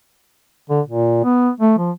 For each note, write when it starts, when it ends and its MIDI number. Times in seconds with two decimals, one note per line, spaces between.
0.70 0.81 50
0.86 1.21 46
1.24 1.49 59
1.60 1.73 57
1.78 1.91 53